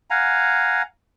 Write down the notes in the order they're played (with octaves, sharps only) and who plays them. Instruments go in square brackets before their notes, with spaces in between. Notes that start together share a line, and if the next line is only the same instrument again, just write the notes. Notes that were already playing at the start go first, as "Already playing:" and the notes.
[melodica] F5 F#5 G#5 A#5